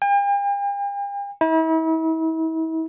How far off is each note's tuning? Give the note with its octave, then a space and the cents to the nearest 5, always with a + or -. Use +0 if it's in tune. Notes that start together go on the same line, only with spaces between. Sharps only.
G5 +45
E4 -40